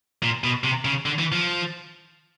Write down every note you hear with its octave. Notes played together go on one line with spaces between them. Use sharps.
A#2
B2
C3
C#3
D3
E3
F3